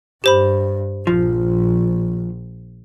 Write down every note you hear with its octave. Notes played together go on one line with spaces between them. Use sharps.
G2 G4 C5 B5
A#1 F3